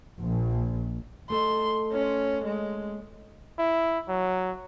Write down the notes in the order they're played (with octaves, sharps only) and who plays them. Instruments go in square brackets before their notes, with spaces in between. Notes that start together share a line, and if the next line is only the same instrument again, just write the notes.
[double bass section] A#1
[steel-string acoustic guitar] A3 A4 D#5 [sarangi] C6
[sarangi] C#4
G#3
[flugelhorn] E4
F#3